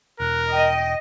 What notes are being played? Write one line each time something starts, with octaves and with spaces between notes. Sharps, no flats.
E1 A#4 F#6
D#5 G5